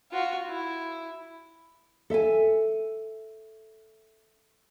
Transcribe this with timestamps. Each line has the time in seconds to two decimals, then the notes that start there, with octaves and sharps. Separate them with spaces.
0.12 F4 F#4
0.48 E4
2.10 A4 E5 F#5 G#5